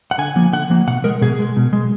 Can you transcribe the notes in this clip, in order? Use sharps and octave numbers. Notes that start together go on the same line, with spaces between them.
F#5
D3 G#5
F3 A#3
D3 F#5
F3 A#3
B2 F#5
G#3 A#4
B2 G#4
G#3
B2
G#3